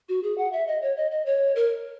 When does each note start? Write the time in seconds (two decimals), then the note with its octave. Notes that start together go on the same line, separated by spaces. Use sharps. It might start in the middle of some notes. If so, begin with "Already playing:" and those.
0.09 F#4
0.23 G#4
0.38 F#5
0.53 E5
0.67 D#5
0.82 C#5
0.97 D#5
1.11 D#5
1.26 C#5
1.56 A#4